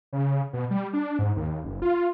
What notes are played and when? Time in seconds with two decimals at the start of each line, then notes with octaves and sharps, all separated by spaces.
0.13 C#3
0.53 B2
0.71 G3
0.93 D4
1.19 G#2
1.36 D#2
1.64 F#1
1.82 F4